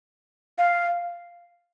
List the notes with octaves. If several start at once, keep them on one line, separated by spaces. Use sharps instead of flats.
F5